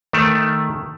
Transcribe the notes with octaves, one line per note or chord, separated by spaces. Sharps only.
D#3 A3